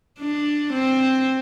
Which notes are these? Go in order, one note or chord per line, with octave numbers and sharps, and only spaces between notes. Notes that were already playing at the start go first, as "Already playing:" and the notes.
D4
C4